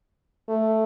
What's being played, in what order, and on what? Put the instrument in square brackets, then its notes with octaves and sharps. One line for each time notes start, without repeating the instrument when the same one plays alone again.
[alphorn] A3